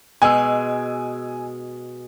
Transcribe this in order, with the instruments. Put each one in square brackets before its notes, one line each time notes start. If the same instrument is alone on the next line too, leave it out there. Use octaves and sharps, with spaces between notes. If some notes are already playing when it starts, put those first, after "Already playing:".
[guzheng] B2 G#3 [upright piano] G#5 E6